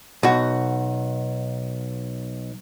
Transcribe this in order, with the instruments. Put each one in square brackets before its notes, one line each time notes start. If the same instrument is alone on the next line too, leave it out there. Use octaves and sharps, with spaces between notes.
[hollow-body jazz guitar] B1 F#4